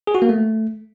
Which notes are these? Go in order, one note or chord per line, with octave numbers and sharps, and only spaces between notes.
G#4
F#4
A#3
A3